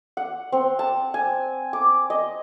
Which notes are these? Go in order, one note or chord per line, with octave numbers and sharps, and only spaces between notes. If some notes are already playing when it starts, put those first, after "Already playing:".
F#5
C4
A5
G#5
D6
D#5